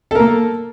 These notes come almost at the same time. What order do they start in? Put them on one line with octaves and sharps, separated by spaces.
A4 A#4 A#3